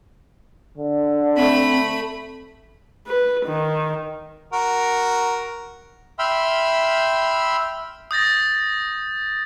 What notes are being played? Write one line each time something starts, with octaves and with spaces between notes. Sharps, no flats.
D3
A3 C4 B5
B4
D#3
F#4 A#4
E5 G5 B5 C6 E6 F6
D#6 G6 A6 A#6